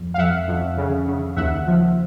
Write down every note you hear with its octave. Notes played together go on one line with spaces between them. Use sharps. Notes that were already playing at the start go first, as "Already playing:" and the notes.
Already playing: F2 F3
F5
F2 E5 F#5
F2
C#3
C#3
D#2 E5 F#5
F3